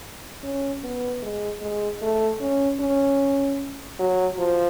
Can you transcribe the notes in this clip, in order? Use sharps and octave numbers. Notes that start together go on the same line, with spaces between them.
C#4
B3
G#3
G#3
A3
C#4
C#4
F#3
F3